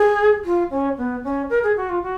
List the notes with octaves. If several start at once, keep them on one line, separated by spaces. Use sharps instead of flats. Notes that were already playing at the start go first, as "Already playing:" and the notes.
Already playing: G#4
F4
C#4
B3
C#4
A#4
G#4
F#4
F4
F#4